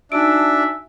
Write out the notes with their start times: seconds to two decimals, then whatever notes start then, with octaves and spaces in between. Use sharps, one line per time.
0.12 D4 D#4 F#4 E5 G#5 A5 D7